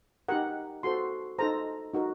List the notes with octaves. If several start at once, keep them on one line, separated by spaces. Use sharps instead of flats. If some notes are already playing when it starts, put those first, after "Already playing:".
D#4 G4 A#4 F#5
F#4 A4 C5 C6
D#4 A4 C5 A#5
D#4 F#4 A#4